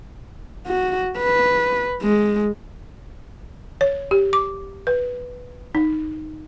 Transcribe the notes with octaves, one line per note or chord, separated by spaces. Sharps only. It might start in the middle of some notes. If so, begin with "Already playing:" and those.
F#4
B4
G#3
C#5
G4
D6
B4
D#4